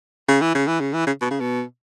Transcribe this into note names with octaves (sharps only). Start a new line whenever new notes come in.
C#3
E3
C#3
E3
C#3
E3
C#3
B2
C#3
B2